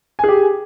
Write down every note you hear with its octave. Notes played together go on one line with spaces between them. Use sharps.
G4 G#4 G#5